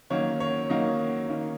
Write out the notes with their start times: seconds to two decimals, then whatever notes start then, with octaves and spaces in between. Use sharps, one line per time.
0.10 D#3 F#3 A#3 C#4 C#5
0.40 C#5
0.70 D#3 F#3 A#3 C#4 D#5
1.29 D#3 A#3 C#4